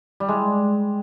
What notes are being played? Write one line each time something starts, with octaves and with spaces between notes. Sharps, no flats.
G3
G#3